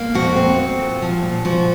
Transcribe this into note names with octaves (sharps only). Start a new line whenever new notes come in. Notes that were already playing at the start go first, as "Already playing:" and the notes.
Already playing: A#3
F2 F#4
C4
C4
A#2
F3
A#2
F3 F#4